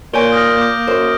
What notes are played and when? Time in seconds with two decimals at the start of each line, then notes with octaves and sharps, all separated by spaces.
0.14 A#2 A#3 C#5 G#5 G6 D7 G7
0.32 D#6 F6 A#6
0.57 D6 G6
0.87 F#2 C5